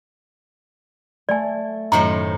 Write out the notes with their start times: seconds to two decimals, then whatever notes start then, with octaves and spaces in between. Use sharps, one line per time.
1.29 A3 D5 G#5
1.92 F#2 A2 D#3 C5 A#5 E7